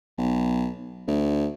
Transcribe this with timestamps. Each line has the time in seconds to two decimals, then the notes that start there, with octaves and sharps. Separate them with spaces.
0.18 B1
1.08 D2